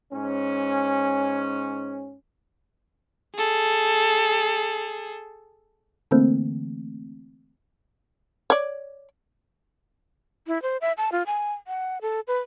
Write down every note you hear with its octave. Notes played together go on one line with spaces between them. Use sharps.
G#2 C#4
G#4 A4
D3 E3 A3 A#3 C4
C#5 D5
E4
C5
E5
A5
F4
G#5
F#5
A4
B4